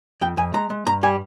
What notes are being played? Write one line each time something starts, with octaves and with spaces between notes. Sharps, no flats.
F2 G5
F2 G#5
G#3 A#5
G#3
G2 A#5
G3 G#5